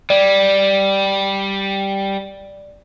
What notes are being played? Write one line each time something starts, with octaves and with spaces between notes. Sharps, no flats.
G3 D5